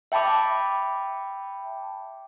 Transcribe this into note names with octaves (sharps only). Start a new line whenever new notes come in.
E5 G5 A5 B5 D6